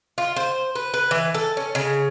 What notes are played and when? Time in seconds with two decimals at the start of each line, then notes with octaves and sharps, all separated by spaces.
0.18 F4
0.36 C5
0.75 B4
0.94 B4
1.11 E3
1.34 A4
1.57 C#4
1.75 C#3